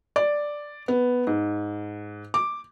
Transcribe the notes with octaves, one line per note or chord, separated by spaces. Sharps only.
D5
B3
G#2
D6